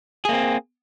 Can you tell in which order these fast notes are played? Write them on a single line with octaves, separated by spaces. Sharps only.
G#4 A#3 C4